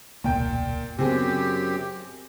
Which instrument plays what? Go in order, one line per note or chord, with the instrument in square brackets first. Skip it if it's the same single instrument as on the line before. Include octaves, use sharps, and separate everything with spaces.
[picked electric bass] E1 C#2 [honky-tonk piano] A#2 G5
[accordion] F#2 G4 [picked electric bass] C#3 B3 [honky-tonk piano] C4 G#4